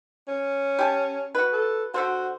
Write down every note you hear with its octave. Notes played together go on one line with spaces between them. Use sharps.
C#4
G4 G#5 A5
F#4 B4
A4
D3 F#4 A4 C5